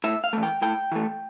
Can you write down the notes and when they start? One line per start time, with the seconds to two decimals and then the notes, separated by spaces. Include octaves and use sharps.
0.04 A2 E5
0.24 F5
0.33 E3 A3
0.43 G5
0.62 A2 G5
0.92 E3 A3